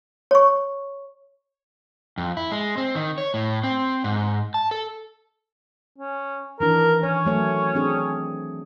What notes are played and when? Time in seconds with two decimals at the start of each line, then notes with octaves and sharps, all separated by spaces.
0.31 C#5 C#6
2.18 F2
2.37 E4
2.52 G#3
2.78 C4
2.95 D#3
3.18 C#5
3.34 A2
3.64 C4
4.04 G#2
4.54 A5
4.71 A4
5.99 C#4
6.60 D#3 E3 D4 A#4
7.03 C#4 C#5
7.25 F#3 A3 C#5
7.75 C4 D4 G#4